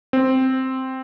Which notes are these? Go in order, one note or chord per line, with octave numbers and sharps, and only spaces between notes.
C4